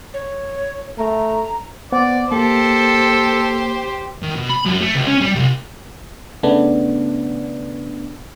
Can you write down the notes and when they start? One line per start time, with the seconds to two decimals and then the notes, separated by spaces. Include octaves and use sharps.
0.14 C#5
0.98 A3 A#5
1.92 B3 C5 D5 F#5
2.32 A#3 G4 A4 C5
4.22 D#3
4.35 B2
4.49 B5
4.65 F#2
4.81 A3
4.95 C#2
5.07 C#4
5.21 G3
5.35 C2
6.43 C#3 A3 B3 D4